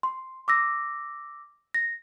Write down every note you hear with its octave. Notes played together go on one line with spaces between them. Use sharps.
C6
D6 E6 A#6
A#6